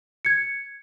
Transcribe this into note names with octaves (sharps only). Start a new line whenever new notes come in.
G#6 C#7